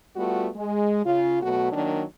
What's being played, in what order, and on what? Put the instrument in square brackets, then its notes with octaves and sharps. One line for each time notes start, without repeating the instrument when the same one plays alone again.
[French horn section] G3 A3 B3 F4 F#4
G#3
C#3 F4
B2 F#3 A3 B3 F#4
D#3 F#3 A#3 D4